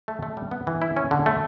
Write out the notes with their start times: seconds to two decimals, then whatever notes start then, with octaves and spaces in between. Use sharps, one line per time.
0.08 A3
0.23 A3
0.37 G3
0.51 B3
0.67 E3
0.82 E4
0.97 C#4
1.11 D3
1.26 A3